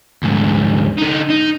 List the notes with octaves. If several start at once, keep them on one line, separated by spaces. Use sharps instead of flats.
D2 G#2
D3 D#4
D#4